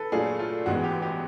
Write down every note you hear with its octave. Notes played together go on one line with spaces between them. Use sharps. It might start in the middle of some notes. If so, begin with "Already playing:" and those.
Already playing: A4 B4
A#2 F#3 A3 D4 F4 G#4
F4
A1 G#2 E3 G#3 B3 F#4
G4
G4